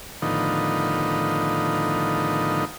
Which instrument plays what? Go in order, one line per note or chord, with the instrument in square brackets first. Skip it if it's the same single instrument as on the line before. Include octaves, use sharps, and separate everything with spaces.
[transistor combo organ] A2 D3 D#3 F3 B3 D#4